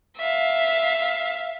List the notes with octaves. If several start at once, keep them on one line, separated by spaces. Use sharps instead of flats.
E5 F5